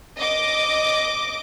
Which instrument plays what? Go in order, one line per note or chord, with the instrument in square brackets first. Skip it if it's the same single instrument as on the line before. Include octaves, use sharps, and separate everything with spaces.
[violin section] D#5 D6